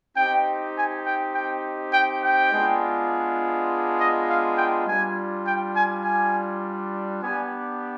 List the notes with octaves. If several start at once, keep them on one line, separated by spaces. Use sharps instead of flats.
C4 D#4 G4 G5
G#5
G5
G5
G5
G5
G#3 B3 D4 F4
D#5
F5
G5
G3 D4 F4 G#5
G5
G#5
G#5
B3 D4 G4 G#5